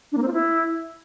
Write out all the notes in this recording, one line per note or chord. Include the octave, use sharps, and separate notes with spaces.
D4
A#3
C4
F4
E4